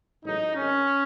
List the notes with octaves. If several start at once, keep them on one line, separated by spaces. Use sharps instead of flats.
A1 G#2 F#3 D#4
G#1 G#2 D#3 C#4